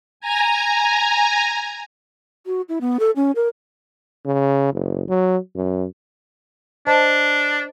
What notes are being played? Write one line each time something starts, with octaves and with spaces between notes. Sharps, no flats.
G#5 A#5
F#4
E4
B3
A4
C#4
A#4
C#3
F#1
F#3
F#2
D4 C5 D#5 A5